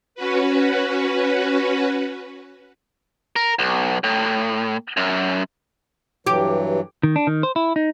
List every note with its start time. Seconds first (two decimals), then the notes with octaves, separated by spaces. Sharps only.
0.15 C#4 F#4 B4
3.36 A#4
3.59 B1
4.04 A2
4.97 F#2
6.27 G2 E3 F#3 G4
7.03 D#3
7.16 D4
7.27 D#3
7.43 C5
7.56 E4
7.76 D#4